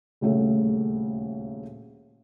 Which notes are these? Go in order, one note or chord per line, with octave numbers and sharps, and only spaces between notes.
D#1 D2 C#3 A3 C#4